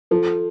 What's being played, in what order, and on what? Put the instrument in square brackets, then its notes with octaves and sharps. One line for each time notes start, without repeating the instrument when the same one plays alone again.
[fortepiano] F3 [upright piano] A4